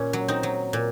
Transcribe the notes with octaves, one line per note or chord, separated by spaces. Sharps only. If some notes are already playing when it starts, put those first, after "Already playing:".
Already playing: A#2 C#4
F#3
C4 D#4
F#3
A#2